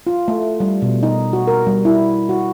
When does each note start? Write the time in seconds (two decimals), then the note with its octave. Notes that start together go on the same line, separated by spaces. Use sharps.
0.07 F4
0.28 A3
0.60 G3
0.82 B2
1.03 D#4
1.33 F#4
1.47 A#4
1.67 G3
1.85 E4
2.29 F#4